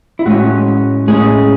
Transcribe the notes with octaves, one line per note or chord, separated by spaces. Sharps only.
E4
A2 G#3 C#4 F#4
A2 G#3 C#4 G#4